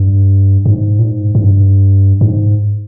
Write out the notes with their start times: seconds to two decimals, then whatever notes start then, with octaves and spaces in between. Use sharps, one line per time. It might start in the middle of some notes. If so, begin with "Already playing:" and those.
Already playing: G2
0.66 G#2
0.99 A#2
1.04 G#2
1.35 G#2
1.43 G2
2.21 G#2